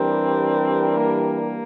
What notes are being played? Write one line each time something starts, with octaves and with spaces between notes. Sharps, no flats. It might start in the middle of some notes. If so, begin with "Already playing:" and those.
Already playing: E3 G3 C4 D4 G4 A#4
A#3